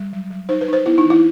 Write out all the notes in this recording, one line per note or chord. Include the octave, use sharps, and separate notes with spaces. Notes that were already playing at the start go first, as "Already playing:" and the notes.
Already playing: G3
F#3
F#3
D#4 C5
B4
D#4 C5
B3 E4
D#4
E3
E4